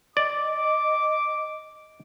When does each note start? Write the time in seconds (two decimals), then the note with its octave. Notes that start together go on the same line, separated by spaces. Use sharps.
0.17 D5 D#5 D6